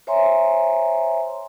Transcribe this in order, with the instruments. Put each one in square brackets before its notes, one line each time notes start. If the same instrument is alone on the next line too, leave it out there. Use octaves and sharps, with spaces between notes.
[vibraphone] C5 C#5 E5 G#5 A#5 C6